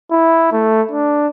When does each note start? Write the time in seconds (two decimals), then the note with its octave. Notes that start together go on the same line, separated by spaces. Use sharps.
0.11 E4
0.52 A3
0.91 D4